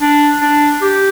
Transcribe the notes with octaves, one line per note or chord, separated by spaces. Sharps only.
D4
D4
G4